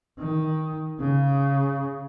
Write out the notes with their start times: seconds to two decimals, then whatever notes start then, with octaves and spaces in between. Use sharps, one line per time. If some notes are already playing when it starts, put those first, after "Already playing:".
0.19 D#3
1.00 C#3